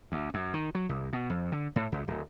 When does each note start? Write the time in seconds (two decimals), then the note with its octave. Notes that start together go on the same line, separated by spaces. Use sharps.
0.12 D2
0.34 F#2
0.54 D#3
0.75 F#3
0.89 C2
1.13 B2
1.30 F2
1.52 D3
1.76 A2
1.92 C#2
2.08 D1